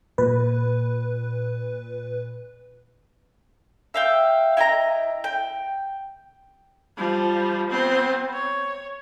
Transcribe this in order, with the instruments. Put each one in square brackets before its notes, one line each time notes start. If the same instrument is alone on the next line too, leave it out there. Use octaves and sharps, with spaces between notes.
[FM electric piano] A#2 B4
[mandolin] E5 F5 G5
E4 D#5 G5 A#5
G5
[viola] F3 G3
B3 C4
C#5